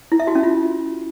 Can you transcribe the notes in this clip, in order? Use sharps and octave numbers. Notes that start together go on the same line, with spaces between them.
E4
E5
F#4
C#4
F4